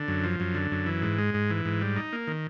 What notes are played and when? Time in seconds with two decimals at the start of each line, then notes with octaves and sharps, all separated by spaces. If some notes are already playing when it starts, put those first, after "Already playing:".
Already playing: D3
0.08 F#2
0.24 F3
0.40 F#2
0.54 D3
0.71 F#2
0.86 E3
1.02 G#2
1.18 G#3
1.34 G#2
1.50 E3
1.65 G#2
1.81 G3
1.96 D#4
2.13 A#3
2.27 D#3